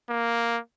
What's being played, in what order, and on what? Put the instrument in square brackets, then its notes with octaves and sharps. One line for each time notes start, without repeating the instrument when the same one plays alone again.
[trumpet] A#3